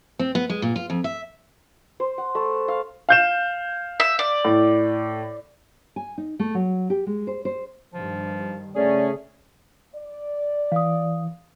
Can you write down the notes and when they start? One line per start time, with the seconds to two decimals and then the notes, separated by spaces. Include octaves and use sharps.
0.19 C4
0.35 B3
0.50 G#3
0.62 A#2
0.76 F4
0.90 F2
1.04 E5
2.00 C5
2.18 F#5
2.35 A3
2.68 F5
3.09 F5 G6 E7
4.00 E5
4.19 D5
4.45 A2
5.96 G#5
6.18 D#4
6.39 A3
6.55 F#3
6.90 G4
7.07 G#3
7.27 C5
7.45 C5
7.94 G2 D#3 F3
8.75 C#3 A3 C#4 G#4 D5
9.96 D5
10.72 E3 F5 D#6